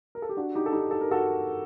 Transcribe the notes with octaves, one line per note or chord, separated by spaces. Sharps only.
A#4
A4
G4
D4 F#4
D#4 G4
A4
D#4 G4
A4
A#4
F#4 A4